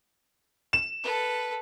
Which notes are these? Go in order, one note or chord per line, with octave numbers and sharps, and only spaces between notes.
E7
A4 B4